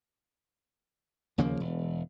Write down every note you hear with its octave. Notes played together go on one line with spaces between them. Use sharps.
D#2 C#3 F3 A#3
E1